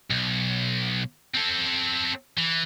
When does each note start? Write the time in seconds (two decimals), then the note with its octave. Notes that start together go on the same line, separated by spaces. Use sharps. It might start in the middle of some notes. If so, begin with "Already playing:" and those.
0.10 B1
1.35 C4 A4
2.38 E3